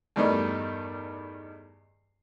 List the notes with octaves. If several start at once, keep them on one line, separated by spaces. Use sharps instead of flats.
E2 G2 D#3 G3 A3 D#4